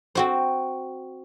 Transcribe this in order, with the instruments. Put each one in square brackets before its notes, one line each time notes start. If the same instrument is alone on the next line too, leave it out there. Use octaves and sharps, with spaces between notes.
[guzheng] C4 F#4 C5